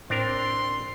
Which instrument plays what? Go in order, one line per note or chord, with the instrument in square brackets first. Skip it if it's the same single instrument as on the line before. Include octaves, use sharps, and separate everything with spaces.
[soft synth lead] A2 [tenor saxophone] C4 [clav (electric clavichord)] D4 A#4 [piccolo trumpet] C6